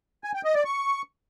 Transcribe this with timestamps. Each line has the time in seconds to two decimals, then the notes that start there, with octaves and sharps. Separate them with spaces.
0.24 G#5
0.34 G5
0.44 D#5
0.55 D5
0.65 C#6